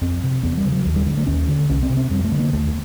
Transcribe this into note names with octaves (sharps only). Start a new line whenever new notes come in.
F2 C4
C3
E2 B3
G3
C#3
F#3
D#2
G3
D3 G#3
A3
D#2 C#4
D3
C2 C#4
C4
C3
C4
F2 G3
A3
D3
A#3
D#2 A3